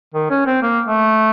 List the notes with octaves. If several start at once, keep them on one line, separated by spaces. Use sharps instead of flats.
D#3
C#4
C4
A#3
A3